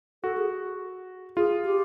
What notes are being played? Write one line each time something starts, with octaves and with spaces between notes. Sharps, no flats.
F#4 A4
G#4
F4 G#4
G4